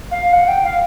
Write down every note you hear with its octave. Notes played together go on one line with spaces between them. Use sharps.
F5
F#5
G5
F5